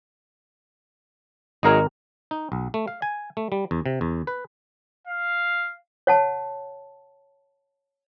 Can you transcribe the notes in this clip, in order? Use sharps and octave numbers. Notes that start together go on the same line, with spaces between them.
G#1 F#3 G#3 D#4 A#4
D#4
B1
A3
F5
G#5
A3
G3
E2
C3
E2
B4
F5
C#5 F#5 A5